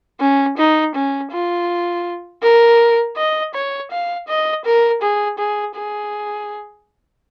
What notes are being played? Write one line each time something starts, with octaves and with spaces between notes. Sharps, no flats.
C#4
D#4
C#4
F4
A#4
D#5
C#5
F5
D#5
A#4
G#4
G#4
G#4